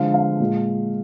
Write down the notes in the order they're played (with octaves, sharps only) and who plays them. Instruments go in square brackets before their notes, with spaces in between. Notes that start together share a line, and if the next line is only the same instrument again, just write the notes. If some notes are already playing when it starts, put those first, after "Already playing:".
Already playing: [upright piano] D3 F3 G#3 F5
F5
A#2 G#3